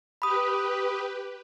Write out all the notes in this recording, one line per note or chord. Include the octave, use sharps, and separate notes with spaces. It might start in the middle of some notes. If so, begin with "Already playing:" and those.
G4 B4 B5 D#6